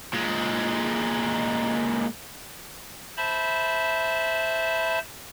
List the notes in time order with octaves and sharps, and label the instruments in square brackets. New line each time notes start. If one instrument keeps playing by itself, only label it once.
[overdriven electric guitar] A#2 G#3
[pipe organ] C5 E5 A5 B5